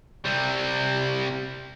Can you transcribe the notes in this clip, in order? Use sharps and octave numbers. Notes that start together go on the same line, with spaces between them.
C3 G3